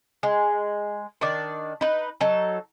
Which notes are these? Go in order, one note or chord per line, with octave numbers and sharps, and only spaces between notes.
G#3
D#3 D4 D5
D#4 B4
F#3 D#4 A4